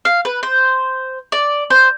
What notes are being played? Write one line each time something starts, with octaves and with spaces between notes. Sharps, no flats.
F5
B4
C5
D5
C5